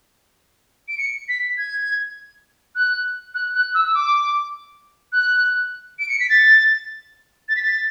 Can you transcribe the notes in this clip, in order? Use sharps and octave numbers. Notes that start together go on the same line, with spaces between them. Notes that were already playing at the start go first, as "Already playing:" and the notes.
D7
C#7
B6
G#6
F#6
F#6
F#6
E6
E6
D6
F#6
D7
C#7
B6
A6
A6
B6
A6